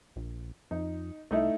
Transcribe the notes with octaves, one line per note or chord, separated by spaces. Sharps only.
A#1
F2 D#4
C2 A3 D#4 E4